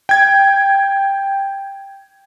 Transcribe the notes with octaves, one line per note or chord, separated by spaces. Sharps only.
G5 G#6